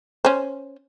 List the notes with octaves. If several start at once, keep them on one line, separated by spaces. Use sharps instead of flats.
C#4 C5